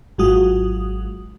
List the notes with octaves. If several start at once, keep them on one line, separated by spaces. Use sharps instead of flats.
G#1 F#3 G#3 F4 F#4 D#6